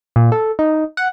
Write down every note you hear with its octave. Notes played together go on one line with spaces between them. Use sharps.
A#2
A4
D#4
F#5